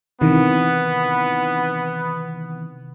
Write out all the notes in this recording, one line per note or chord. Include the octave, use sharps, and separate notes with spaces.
C3 D#3 E3 B3